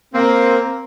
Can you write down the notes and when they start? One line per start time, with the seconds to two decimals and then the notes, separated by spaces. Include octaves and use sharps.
0.14 A#3 C4